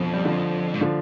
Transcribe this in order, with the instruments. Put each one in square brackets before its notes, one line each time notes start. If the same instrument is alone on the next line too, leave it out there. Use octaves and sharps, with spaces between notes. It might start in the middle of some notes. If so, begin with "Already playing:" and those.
Already playing: [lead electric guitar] F2 [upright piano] B2 D3
[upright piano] G3
D3 F3
[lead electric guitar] G#2
[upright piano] D3 F3